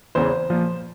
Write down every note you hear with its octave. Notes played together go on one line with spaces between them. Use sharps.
E2 C#3 E3 C5
A#2 F3